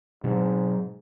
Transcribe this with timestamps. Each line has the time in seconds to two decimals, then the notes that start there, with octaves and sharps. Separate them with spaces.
0.24 G#2 B2 F#3 C4